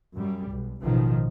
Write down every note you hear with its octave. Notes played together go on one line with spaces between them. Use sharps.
F#2 G3
B1
A1 B2 D#3 F3